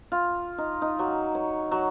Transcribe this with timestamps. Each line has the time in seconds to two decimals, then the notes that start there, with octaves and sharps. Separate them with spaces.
0.12 F4
0.58 D#4
0.82 D#4
0.99 F#3
1.35 C#5
1.71 F#3